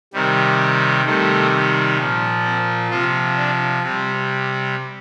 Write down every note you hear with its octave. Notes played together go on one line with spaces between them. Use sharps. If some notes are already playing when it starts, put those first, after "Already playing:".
C3 D#3 G3
C3 D#3 G3 A3
A#2 F3
C4
C3 F3 F4
D4
C3 G3 C4